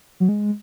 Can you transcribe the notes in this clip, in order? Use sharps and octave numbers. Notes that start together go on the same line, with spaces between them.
F#3
G#3